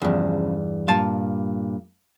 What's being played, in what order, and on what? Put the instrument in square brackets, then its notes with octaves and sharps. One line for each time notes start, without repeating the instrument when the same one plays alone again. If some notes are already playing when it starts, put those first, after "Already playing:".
[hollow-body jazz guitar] E2 G2 [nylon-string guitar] C#3 F3 A4
[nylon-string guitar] G2 A#2 G3 [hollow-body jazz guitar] F5 A5